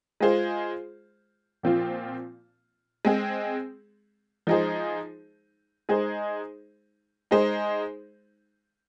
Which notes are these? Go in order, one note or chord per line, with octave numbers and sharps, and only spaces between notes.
G#3 F4 G#4 C5
A#2 F3 C4 F4
G#3 C4 G#4
F3 G#3 D#4 G#4 C5
G#3 D#4 G#4 C5
G#3 D#4 G#4 C5